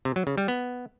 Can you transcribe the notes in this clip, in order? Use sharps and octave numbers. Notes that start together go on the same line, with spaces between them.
C3
F#3
C#3
G3
B3